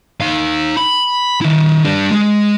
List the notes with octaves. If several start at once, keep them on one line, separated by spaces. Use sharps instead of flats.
D#4 F5
B5
D#3 E4
G3 D4
G#3